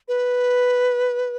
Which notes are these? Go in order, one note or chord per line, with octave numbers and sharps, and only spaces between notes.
B4